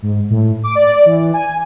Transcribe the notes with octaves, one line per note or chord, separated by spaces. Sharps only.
G#2
A2
D6
D5
E3
G#5